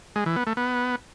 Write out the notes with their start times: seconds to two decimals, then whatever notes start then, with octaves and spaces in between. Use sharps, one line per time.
0.16 G#3
0.26 E3
0.36 B3
0.47 A3
0.57 B3